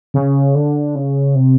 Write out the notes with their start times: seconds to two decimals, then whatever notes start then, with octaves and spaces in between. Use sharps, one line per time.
0.14 C#3
0.55 D3
0.95 C#3
1.35 C3